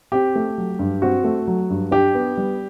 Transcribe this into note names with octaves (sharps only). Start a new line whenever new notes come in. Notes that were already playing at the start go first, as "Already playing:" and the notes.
C4 G4
A3
F#3
G2
C4 F#4
A3
F#3
G2
D4 G4
B3
G3